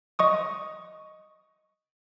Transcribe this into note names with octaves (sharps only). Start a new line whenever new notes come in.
D#5 C#6 D#6